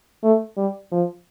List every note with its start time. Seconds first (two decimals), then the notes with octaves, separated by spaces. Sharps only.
0.24 A3
0.57 G3
0.92 F3